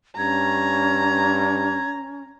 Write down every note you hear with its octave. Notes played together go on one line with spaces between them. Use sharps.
G2 C#4 A#5 G#6